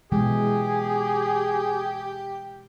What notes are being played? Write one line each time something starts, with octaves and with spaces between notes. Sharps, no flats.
B2 E3 G#3 G4 G#4